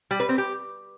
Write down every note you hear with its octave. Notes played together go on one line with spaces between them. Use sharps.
G3
B4
C4
G4